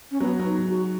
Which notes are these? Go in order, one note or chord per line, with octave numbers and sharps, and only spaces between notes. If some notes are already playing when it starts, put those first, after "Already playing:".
C#4
F#3 B3
F#3
D#4
G#2
F#4